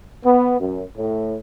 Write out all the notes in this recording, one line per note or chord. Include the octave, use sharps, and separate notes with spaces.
B3
F#2
A2